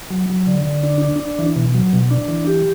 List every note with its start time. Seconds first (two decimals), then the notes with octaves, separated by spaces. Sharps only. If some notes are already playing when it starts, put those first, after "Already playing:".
0.11 F#3
0.30 F#3
0.47 D3
0.65 D3
0.83 D4
1.02 D4
1.20 D4
1.39 E3
1.56 B2
1.74 F#3
1.93 B2
2.11 D4
2.28 E3
2.47 G4